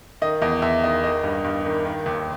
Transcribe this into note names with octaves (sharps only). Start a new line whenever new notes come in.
D#3 D#5
E2 D#5
E2 E5
D#3 D#5
D#3 D#5
G2
G2
D#3
D#3
D#2